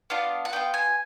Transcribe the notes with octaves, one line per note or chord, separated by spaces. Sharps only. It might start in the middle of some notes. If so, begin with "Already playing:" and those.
B3 D4 F4 F5
F#5
B3 D4 F4 G5
G#5